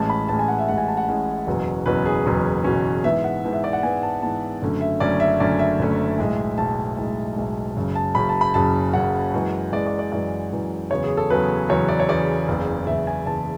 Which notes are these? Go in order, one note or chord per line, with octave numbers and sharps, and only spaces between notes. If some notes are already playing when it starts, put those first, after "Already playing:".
Already playing: A1 A2 G#3 C#4 A5
B5
A1 A2 G#3 C#4 A5
G#5
F#5
E5
A1 A2 G#3 C#4 F#5
G#5
A5
F#5
A1 A2 G#3 C#4
F#1 E2 B2 F#3 C#4
F#1 E2 B2 F#3 C#4 B4
G#4
F#1 E2 B2 F#3 C#4
F#1 E2 B2 F#3 C#4
G#2 E3 B3 E5
F#5
G#2 E3 B3
E5
D5
F#5
G#2 E3 B3 G#5
A5
G#2 E3 B3 A5
F#1 F#2 D3 A3 C#4
E5
F#1 F#2 D3 A3 C#4 D5
E5
F#1 F#2 D3 A3 C#4 D5
E5
F#1 F#2 D3 A3 C#4
B1 A2 G#3
B1 A2 G#3 A5
B1 A2 G#3
B1 A2 G#3
F#1 F#2 C#3
A5
F#1 F#2 C#3 B5
A5
B5
F#1 F#2 C#3 A5
F#1 F#2 C#3 F#5
F#2 E3 G#3
F#2 E3 G#3 D5
D5
D5
F#2 E3 G#3 D5
F#2 E3 G#3
E2 C#3 F#3 B3 C#5
G#4
A4
E2 C#3 F#3 B3 B4
E2 C#3 F#3 B3 C#5
D5
C#5
E2 C#3 F#3 B3 D5
F#1 E2 C#3
F#1 E2 C#3 E5
G#5
F#1 E2 C#3 A5